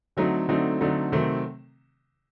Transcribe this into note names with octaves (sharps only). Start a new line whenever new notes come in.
D3 F#3 A3 C4 D#4
D3 F#3 A3 C4 D#4
D3 F#3 A3 C4 D#4
C3 D#3 F#3 A3 C4